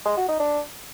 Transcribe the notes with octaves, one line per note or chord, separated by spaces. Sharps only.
G#3
F#4
D#4
D4